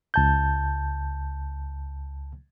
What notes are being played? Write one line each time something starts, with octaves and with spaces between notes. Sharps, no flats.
C#2 A5 G6